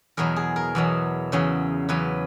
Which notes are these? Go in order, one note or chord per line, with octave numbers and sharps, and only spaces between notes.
E2 B2 F#3 A#4
G#4
A#4
E2 B2 F#3
E2 C#3 F#3
E2 C#3 F#3 B4